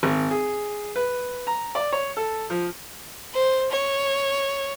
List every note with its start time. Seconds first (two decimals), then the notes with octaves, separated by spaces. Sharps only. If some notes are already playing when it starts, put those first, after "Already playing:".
0.03 G#1
0.31 G#4
0.96 B4
1.47 A#5
1.75 D5
1.92 C#5
2.17 A4
2.50 F3
3.34 C5
3.71 C#5